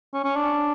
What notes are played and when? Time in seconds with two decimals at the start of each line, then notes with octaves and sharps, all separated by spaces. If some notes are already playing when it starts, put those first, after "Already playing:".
0.14 C#4
0.24 C#4
0.36 D4